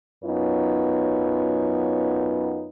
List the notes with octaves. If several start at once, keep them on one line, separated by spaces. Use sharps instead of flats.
F#2 B3 D#4 F4 B4 C#5